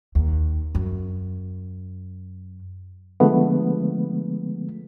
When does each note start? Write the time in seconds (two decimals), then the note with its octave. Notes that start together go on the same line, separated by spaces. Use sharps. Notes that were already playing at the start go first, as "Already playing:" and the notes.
0.15 D#2
0.75 F#2
3.20 D3 F3 G#3 A3 B3